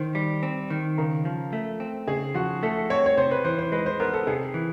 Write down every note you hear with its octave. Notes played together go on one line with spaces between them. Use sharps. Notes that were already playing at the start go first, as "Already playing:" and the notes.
Already playing: D#3 C5
G3
C4
D#3
C#3 A#4
F3
A3
C4
C#3 G#4
F3 F#4
A3 A4
C4 C#5
C#5
C3 C5
B4
E3 C5
C5
G#3 B4
C5
B3 A#4
A4
C3 G#4
E3